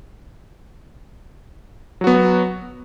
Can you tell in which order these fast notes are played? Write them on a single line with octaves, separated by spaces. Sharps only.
F#3 F#4 B3